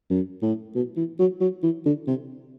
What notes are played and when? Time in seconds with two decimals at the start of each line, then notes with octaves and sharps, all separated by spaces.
0.10 F#2
0.42 A2
0.75 B2
0.97 E3
1.19 F#3
1.41 F#3
1.63 E3
1.85 D3
2.07 C3